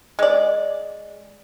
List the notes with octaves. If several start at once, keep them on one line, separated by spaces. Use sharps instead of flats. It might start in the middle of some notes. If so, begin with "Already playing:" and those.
G#3 D5